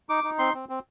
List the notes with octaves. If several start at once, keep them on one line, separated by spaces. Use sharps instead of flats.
D#4 D6
D#4
C4 C6
C4
C4